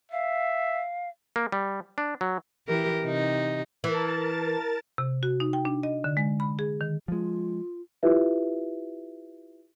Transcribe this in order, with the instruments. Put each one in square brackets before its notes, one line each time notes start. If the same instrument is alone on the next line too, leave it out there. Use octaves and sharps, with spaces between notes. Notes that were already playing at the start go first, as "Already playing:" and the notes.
[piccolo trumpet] E5 [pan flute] F5
[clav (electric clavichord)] A#3
G3
D4
F#3
[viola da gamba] E3 G4 A#4
C3 D#4
[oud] E3 [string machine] A#4 A5 A6
[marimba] C3
F#4
D#4
G5
D4
D#5
D3
G#3
B5
G#4
D#3
[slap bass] F3 G#3 [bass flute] F4
[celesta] E4 F4 G4 B4 E5